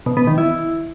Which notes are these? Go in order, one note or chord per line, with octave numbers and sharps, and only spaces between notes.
B2
B3
D#3
E4